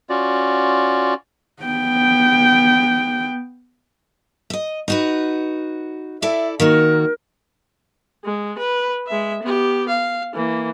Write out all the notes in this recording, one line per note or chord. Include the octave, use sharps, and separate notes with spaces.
C#4 F4 F#4 D5
B3 G5
D#5 E5
D#4 F#4 B4
E4 A4 D5 E5
D#3 A#3 F#4 A#4
G#3
B4
G#3 E5
B3 G4
F5
E3 A#3